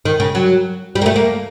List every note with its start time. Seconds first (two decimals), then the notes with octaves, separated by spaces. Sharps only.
0.05 D#3
0.20 C#3
0.35 F#3
0.95 G3
1.02 A#3
1.06 A3
1.16 A#3